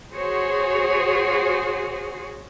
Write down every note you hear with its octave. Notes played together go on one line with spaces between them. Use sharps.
F#4 G#4 C5 C#5